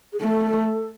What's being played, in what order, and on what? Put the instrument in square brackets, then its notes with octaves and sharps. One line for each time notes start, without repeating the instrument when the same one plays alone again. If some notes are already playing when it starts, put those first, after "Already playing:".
[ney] G#4
[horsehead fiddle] A3 [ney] A4